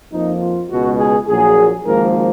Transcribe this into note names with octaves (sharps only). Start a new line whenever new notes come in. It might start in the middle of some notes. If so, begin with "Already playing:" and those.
F2 F3 A#3 D#4
F4
C#2 B2 G#3 F#4
G#4
A#1 A#2 F#3 G#4
G#1 G#2 F3 A#3 A#4